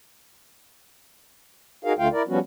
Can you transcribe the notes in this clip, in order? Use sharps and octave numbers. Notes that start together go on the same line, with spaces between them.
D#4 F#4 G#4 A#4 F5
D2 D3 A3 F4 F5 G5
E4 A#4 D5
F3 G3 B3 C#4 F#4